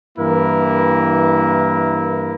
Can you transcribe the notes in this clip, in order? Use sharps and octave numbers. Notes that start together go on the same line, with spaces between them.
G2 E3 A#3 E4 A#4